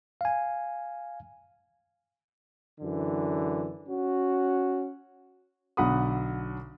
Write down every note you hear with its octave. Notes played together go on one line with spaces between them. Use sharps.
F5 G#5
F#2 D3 E3
C#4 F#4
B1 D3 F#5 B5 D#6